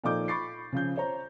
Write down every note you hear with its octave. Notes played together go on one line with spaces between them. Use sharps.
A#2 F3 D#4 A4 D6 G6
B5 C#6 D6 A6 C7
C#3 F3 C#4 G6
C5 C#5 A#5